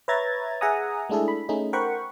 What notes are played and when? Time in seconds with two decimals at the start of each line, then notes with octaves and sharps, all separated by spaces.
0.08 B4 C#5 E5 A#5 G#6 A6
0.61 G#4 E5 F#5 G#5 A#5 D#6
1.09 G#3 A3 D4 E4 G#4 A4
1.28 B5
1.49 A3 C#4 D#4 G#4
1.73 A#4 C5 F#5 G5 B5 C#6